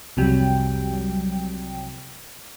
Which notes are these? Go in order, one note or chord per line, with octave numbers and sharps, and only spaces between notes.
C2 F2 C3 F#3 G3 G5